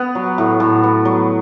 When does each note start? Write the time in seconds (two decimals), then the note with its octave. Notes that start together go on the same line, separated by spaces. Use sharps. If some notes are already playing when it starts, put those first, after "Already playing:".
Already playing: B3 B4
0.15 F#3
0.38 A2
0.60 A2
0.83 B3
1.05 F#3